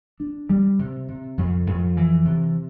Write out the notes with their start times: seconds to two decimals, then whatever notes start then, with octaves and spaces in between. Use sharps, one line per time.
0.20 D4
0.49 G3
0.79 C3
1.08 C3
1.38 F2
1.67 F2
1.97 E3
2.25 C3